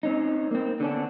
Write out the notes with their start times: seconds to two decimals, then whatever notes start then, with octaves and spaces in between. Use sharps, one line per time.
0.03 C4 C#4 D#4
0.51 A#3 C4
0.80 D3 B3 C#4 D4